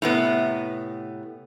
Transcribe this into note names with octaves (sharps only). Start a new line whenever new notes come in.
A2 C3 B3